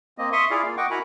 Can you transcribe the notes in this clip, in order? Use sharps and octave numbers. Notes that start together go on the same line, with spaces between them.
A#3 C4 D#5
E5 C6 C#6 D#6
E4 F4 G#4 D5 F5
A#3 F4
D#5 F#5 G5 C#6 D6
E4 F#4 A#4 G#5 A#5 B5